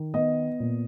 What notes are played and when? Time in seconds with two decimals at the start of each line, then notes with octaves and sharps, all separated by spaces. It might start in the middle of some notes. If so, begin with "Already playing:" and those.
Already playing: D#3
0.14 B3 D#5
0.60 A#2